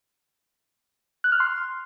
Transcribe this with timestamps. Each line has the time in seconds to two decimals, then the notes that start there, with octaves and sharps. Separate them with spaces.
1.24 F#6
1.32 F6
1.40 C6